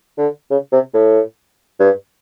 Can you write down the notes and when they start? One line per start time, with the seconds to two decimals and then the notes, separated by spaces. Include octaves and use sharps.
0.18 D3
0.50 C#3
0.72 C3
0.94 A2
1.80 G2